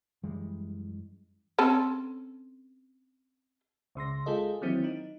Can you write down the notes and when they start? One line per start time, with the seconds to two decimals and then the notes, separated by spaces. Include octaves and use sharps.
0.23 F#2 E3 G3 G#3
1.59 C4 C#4 A4
3.95 C#2 C#3 C6 A#6
4.26 G#3 F4 G#4 A4 D#5
4.61 D#3 E3 F#3 A#3 C4 E4
4.84 D#4